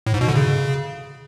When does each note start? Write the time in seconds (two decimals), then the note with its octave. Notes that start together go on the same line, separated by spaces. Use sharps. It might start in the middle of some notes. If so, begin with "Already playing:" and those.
0.06 A2
0.14 G#2
0.21 B2
0.28 D3
0.36 C#3